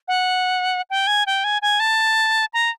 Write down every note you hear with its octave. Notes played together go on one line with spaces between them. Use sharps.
F#5
G5
G#5
G5
G#5
G#5
A5
A#5